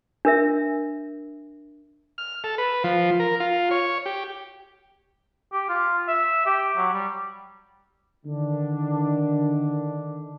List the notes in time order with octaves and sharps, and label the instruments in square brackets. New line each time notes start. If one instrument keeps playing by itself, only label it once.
[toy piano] D4 A#4 E5
[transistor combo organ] F6
A4
B4
F3
A#4
F4
C#5
G4
[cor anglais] G4
F4
E5
G4
F#3
G3
[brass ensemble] D3 D#3 D4